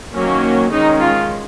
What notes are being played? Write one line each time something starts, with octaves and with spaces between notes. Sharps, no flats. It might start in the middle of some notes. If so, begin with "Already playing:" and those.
D#3 F#3 A#3 C#4
D#3 G#3 C#4 D#4
F4